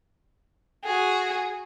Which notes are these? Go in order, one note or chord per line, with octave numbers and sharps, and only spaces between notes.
F#4 G#4